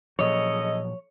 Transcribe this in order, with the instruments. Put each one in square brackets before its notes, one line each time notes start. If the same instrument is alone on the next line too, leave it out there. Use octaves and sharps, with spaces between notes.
[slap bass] A#2 F3 F#3 [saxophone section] C#3 A4 D#5 [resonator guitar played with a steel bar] C#5